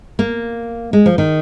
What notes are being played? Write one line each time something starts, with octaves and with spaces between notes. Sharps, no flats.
A#3
G#3
F3
D#3